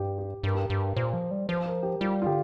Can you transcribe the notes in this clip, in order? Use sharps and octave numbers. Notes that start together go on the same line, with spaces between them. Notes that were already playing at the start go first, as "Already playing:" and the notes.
Already playing: G2 G4
G4
G2 A#4
G4
A#4
G2
A#2 C5
F3
G3
F3 C5
A#4
G4
G3 F4
F4
D3 G4